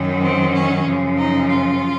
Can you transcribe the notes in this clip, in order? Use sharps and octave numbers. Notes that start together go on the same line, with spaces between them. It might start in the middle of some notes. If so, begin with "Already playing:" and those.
Already playing: F#2 D#3 F#3
C4
C#4
F#2 C#3 F3
D#4
F4